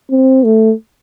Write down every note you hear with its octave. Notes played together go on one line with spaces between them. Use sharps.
C4
A3